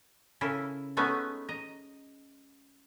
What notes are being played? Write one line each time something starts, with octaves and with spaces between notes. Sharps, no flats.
C#3 E4 A4 A#4
G#3 A3 B3 C#4 D#4 F#4
D#5 A#5